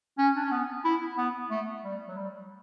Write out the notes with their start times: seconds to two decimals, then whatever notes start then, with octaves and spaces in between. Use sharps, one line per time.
0.18 C#4
0.36 D4
0.43 C#4
0.51 B3
0.84 E4
1.18 B3
1.50 A3
1.84 G3
2.08 F#3
2.17 G3